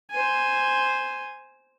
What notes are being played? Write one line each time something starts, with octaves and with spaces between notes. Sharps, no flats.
C5 G#5